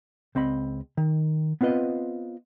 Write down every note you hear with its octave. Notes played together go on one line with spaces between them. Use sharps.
C#2 C4 D#5 B5
D#3
B3 C4 F4 B4 D#5